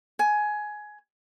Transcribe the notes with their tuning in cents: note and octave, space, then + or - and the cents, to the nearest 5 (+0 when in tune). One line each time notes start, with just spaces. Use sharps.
G#5 +15